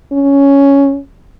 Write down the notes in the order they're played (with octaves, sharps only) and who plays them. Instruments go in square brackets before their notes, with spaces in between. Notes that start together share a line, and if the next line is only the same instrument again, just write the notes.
[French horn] C#4